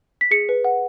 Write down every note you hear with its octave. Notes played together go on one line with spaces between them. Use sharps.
B6
G#4 C#7
B4
F#5